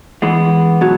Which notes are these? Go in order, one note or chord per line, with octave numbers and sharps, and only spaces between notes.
E3 G#3 B3
B2 F#3